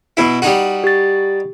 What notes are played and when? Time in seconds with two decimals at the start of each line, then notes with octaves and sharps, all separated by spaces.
0.17 B2 E4
0.42 G3 D#4 F#4
0.84 G4 A6